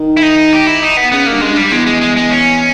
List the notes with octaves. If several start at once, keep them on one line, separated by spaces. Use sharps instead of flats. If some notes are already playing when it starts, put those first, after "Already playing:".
Already playing: D#3
E4
D#4
G4
E4
D#4
B3
C#3 B3
A#3
G2
G#3
G2
G3
E2 G#3
G#3
G#3
G#3
C#4